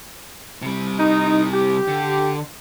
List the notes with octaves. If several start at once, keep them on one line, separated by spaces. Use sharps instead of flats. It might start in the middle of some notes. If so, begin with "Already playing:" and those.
C3 G3
D#4
G4
D3